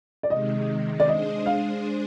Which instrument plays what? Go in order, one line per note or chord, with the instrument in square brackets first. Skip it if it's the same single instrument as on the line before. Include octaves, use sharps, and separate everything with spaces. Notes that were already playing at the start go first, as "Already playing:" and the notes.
[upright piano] D5
[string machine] C3 D#3 G#3 [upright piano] D#5
[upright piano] D5
[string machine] G#3 D4 G#4 C5 [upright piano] D#5
[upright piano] F5